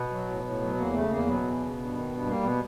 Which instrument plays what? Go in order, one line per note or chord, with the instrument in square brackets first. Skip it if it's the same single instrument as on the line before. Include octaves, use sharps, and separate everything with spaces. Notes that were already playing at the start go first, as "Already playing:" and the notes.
Already playing: [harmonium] B2 B3
F#3
A2
A2
F#3
E2 A#3
C#3 A3
E2 A#3
B2 F#3 B3
E2
C#3
G2
D#3
G2
G3 A#3
B2 B3